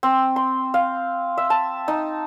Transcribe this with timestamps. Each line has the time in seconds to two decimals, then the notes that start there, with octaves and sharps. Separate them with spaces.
0.03 C4
0.36 C6
0.74 F5
1.38 E5
1.50 A5
1.88 D#4